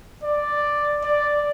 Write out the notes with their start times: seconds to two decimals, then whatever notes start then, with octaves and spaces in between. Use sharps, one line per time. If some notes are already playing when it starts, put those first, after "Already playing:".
0.23 D5
1.04 D5